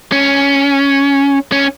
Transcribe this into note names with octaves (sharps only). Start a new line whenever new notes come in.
C#4
C#4